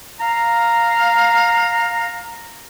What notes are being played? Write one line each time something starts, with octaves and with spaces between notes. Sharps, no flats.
F5 A#5